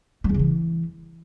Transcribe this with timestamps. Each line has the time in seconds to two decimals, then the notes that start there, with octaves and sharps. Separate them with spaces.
0.24 G3
0.29 E2
0.34 C#3
0.39 E3